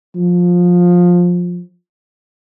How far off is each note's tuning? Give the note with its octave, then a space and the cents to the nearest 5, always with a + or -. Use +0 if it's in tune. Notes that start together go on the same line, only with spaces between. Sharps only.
F3 +15